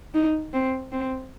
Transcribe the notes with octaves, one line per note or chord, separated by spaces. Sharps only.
D#4
C4
C4